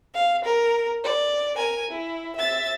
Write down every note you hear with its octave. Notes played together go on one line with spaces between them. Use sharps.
F5
A#4
D5
A#4 G#5
E4
E5 A6